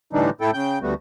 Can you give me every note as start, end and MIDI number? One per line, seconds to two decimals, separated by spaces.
0.13 0.30 45
0.13 0.30 50
0.13 0.30 52
0.13 0.30 55
0.13 0.30 62
0.13 0.30 63
0.41 0.51 45
0.41 0.51 64
0.41 0.51 69
0.41 0.51 79
0.54 0.79 49
0.54 0.79 79
0.54 0.79 91
0.82 0.94 38
0.82 0.94 55
0.82 0.94 57
0.82 0.94 59
0.82 0.94 66